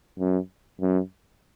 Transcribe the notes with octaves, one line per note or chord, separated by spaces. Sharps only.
F#2
F#2